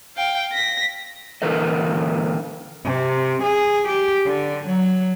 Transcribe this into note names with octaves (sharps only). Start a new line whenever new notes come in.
F5 G5
A#6 B6
A#2 D3 E3 A4 A#4 D#5
C3
G#4
G4
D3
F#3